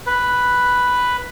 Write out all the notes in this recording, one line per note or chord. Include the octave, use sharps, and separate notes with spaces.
B4